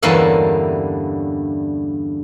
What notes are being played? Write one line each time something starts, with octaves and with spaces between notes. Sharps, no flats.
E2 G2 D3 A#3 C#4 E5